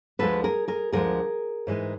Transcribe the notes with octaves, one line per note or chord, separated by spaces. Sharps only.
D2 D3 F3 G#3 A4 B4
G#4 A#4
G#4 A#4
D2 D3 F3 G#3 G#4 A#4
G#2 E3 G#3